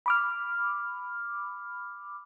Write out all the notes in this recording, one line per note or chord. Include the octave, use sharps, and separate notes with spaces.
B5 D6 F6